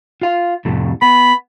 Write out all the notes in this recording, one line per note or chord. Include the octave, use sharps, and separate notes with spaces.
F4 F5
F2 A2 C3
B3 B5